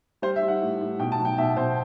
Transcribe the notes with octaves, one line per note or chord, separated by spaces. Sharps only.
G3 C5
E5
G3
F#5
A2
A2
B2 G5
A5
F#3
G5
B2 E5
B2 C5